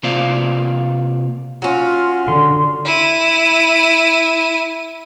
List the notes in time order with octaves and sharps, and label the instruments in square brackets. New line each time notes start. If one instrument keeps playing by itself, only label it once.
[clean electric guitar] C3 A#3 F4 C5 D5 F5
[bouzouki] F#3 C#4 [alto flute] F4
[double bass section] D3 [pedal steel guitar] C6
[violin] E4 D#7